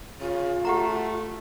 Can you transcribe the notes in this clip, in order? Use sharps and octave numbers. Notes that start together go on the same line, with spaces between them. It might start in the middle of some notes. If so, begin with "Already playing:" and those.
C#3 F4
A3 G4 F#5 A#5